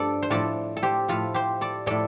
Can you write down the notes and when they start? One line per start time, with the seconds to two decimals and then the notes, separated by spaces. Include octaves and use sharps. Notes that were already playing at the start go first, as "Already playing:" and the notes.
Already playing: G2 F3 D4 A4 D5
0.22 C5
0.30 A2 F3 A4 D5
0.77 A4
0.83 G4 C5
1.08 A2 F3 F4 A4
1.34 G4 C5
1.61 A4 D5
1.86 A2 F3 A4 D5